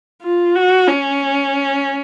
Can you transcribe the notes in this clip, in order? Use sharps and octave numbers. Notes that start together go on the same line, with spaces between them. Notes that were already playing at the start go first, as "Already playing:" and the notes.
F4
F#4
C#4